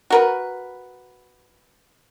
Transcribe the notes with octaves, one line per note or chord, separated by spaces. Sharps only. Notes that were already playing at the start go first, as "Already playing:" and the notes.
F#4 A#4 B4